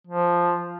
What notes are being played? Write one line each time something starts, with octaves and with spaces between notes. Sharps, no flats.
F3